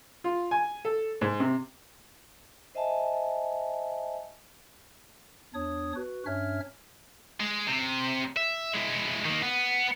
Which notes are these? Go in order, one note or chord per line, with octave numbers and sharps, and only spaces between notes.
F4
G#5
A4
G#2
C3
C5 D#5 E5 G#5 A5
E2 D4 C#5 D#6
F#4 B4
G2 C#4 D4 C#5 E5 F6
G#3
C3
E5
G#3 E4
D#3 A#3
B3